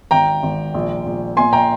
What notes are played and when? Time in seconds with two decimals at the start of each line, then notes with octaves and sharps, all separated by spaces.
0.11 G#1 G5 A#5
0.43 G#1
0.74 A#1
1.06 A#1
1.37 A#2 G#5 C6
1.53 G5 A#5